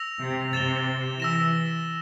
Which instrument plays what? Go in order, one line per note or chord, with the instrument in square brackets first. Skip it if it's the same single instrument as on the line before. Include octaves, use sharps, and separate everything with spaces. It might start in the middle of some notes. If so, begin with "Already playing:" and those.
Already playing: [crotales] E6 A#6 F7
[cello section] C3
[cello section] C3 [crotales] A6 E7 G7
[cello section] E3 [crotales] E6 A#6 E7